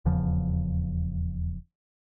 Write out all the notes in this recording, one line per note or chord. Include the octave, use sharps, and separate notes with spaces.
D#1 E2 C#3 F3